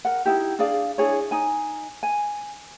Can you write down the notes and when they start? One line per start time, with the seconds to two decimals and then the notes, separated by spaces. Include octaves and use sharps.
0.05 A#4 F#5
0.25 D#4 E4 G4
0.59 D4 G#4 D5 F5
0.98 D4 E4 G#4 C#5
1.31 D#4 G#5
2.03 G#5